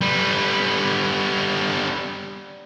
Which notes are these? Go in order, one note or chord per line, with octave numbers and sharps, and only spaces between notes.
G3 B3